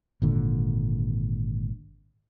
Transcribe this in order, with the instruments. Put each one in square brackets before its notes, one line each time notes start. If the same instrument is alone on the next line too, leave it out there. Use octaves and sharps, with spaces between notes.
[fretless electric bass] G#1 A#2 D3